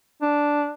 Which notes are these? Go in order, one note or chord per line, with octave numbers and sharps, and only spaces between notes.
D4